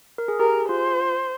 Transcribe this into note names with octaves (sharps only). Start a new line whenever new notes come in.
A#4
G#4
G4 A#4
G#4
F4 C5